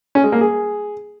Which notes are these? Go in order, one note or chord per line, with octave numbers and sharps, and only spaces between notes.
C#4
G#3
A#3
G#4